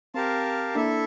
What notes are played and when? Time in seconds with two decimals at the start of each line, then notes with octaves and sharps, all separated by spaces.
0.14 C4 G4 A#4 F5 A5
0.75 A#3 D4 E4 A4 E5